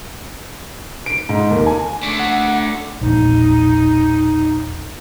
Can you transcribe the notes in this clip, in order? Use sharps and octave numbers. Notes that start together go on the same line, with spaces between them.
D7
G#2
D#2
G#5
A3 D4
F#5
E1 A#1 D#4